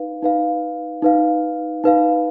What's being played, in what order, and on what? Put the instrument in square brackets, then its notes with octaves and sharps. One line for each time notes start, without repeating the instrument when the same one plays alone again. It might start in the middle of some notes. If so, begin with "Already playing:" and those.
Already playing: [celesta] D#4 B4 F5
D#4 B4 F5
D#4 B4 F5
D#4 B4 F5